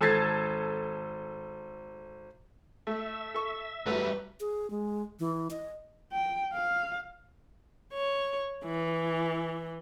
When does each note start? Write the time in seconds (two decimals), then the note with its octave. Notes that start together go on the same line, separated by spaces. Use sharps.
0.01 G#1 A4 A5 G#6 A6 C7
2.87 A3 E5
3.34 A4 C#6
3.86 F#2 F#3 G3 A3 B4
4.40 G#4
4.70 G#3
5.20 E3
5.51 D#5
6.12 G5
6.53 F5
7.93 C#5
8.65 E3